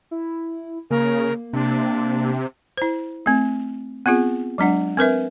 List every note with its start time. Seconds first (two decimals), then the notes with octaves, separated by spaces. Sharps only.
0.11 E4
0.91 C#3 A#3 A#4
1.53 C3 D4
2.77 E4 C5
3.26 A3 C4
4.06 B3 C4 F4 G#4
4.58 F#3 G#3 D4 F#5
4.97 C4 A#4 B4 E5